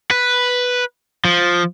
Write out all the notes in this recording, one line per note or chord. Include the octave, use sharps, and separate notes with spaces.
B4
F3